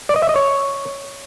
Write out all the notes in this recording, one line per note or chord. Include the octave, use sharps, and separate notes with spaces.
D5
D#5
E5
D#5
C#5